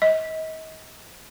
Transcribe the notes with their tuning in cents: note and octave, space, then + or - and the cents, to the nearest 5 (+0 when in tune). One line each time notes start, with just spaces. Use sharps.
D#5 +35